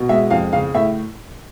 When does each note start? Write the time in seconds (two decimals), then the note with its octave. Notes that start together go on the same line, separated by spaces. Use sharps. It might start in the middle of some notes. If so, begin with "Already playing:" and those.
Already playing: B2
0.09 G#3 E5
0.30 F2 F5
0.53 C#3 F5
0.74 A2 E5